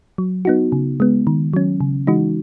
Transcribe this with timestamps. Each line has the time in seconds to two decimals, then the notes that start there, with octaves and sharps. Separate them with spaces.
0.18 F#3
0.45 B3 D#4 F#4
0.72 C#3
1.00 G#3 B3
1.27 D#3
1.53 F#3 C#4
1.81 C#3
2.07 E3 G#3 D#4 F#4